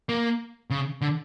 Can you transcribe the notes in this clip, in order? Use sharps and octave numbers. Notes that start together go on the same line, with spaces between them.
A#3
C#3
D3